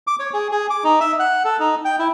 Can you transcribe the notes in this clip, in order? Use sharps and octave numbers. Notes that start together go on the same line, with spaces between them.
D6
C#5
G#4
G#4
D6
D#4
E5
F#5
A4
D#4
G5
E4